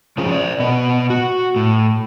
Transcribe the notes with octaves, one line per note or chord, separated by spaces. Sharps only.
C#3 F3 C#4 F4 G#4 C5
C5 D5
B2 B3 D#5
F#4
A2